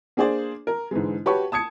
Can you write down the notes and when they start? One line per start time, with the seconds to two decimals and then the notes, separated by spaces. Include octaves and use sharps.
0.17 A#3 D4 G#4 C5 D5
0.67 A#4
0.91 G#2 D3 E3 G#3
1.26 F#4 G4 B4 C#5 A5 C#6
1.52 A5 D#6 G#6 C#7